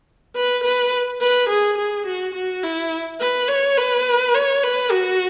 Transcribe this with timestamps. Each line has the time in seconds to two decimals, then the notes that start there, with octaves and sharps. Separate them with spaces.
0.35 B4
0.63 B4
1.21 B4
1.49 G#4
1.78 G#4
2.06 F#4
2.35 F#4
2.63 E4
3.21 B4
3.48 C#5
3.78 B4
4.34 C#5
4.63 B4
4.91 F#4